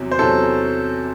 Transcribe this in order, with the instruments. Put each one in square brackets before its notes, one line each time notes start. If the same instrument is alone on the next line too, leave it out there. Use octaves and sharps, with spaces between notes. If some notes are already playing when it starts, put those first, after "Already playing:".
Already playing: [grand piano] E2 C3 F#3
C5
E2 C3 F#3 C#4 A4